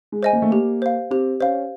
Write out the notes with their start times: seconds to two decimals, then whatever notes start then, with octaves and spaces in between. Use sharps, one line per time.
0.12 G#3
0.23 C5 D#5 G#5
0.33 A#3
0.42 A3
0.51 A#3 G4
0.82 C5 F5
1.11 C4 G4
1.40 C#4 C5 F5